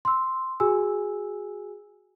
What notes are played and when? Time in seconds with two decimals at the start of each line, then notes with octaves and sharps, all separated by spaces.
0.05 C6 E6
0.60 F#4 G#4 G#5 E6